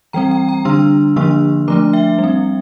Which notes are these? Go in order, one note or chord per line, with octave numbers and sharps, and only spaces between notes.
E3 G3 C4 G5 A#5
G5 A#5
G5 A#5
D3 G3 D4 C6 E6
D3 F3 A#3 D4 C6 E6
F3 A3 D4 A#5 D6
E5 G5
G3
C4